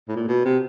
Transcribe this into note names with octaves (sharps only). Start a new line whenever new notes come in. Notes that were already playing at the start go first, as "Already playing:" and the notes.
A2
A#2
B2
C3